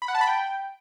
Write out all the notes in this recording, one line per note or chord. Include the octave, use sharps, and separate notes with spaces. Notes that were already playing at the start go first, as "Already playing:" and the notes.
B5
F#5
A5
B5
G5